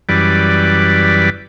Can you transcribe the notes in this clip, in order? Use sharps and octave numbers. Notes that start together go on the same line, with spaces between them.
F#2 E3 G3 B4 D5